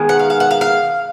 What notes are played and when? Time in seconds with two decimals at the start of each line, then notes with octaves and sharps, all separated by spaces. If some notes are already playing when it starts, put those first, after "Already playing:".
Already playing: D#3 G#3 B3
0.09 F#5
0.19 F5
0.30 F5
0.40 F#5
0.51 F5
0.61 F5